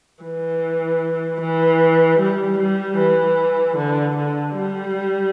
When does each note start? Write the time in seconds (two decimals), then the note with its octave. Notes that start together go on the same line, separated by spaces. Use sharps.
0.23 E3
1.40 E3
2.19 G3
2.59 G3
2.98 E3
3.77 D3
4.16 D3
4.56 G3